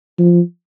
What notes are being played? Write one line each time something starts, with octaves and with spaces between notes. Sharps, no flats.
F3